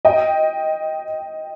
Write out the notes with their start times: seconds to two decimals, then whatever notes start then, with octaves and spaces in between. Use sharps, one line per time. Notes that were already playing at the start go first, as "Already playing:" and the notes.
0.05 D#5 G5